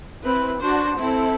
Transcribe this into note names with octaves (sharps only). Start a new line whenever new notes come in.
C4 E4 B4
D4 F#4 C5
C4 E4 A4